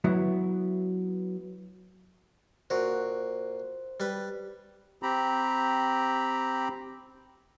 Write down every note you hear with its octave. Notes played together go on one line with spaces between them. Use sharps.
F#3 B3 E4
A#2 F#4 C5
G3 B4
C4 G4 A#5 B5